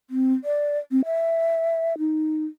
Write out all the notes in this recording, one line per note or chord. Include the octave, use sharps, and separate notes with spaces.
C4
D5
C4
E5
D#4